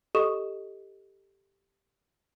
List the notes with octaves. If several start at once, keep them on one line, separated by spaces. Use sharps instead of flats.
G4 A4 D#5 C#6 D#6 E7